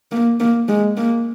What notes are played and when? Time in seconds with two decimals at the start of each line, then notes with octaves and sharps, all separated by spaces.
0.12 A#3
0.40 A#3
0.69 G#3
0.97 A#3